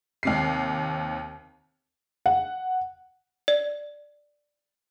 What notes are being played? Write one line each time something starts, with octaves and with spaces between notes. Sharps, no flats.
D#2 C3 C7
F#5
D5